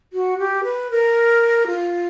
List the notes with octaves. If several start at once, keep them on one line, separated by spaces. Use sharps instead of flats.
F#4
G4
B4
A#4
F4